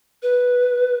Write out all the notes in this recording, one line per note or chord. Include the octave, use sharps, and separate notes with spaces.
B4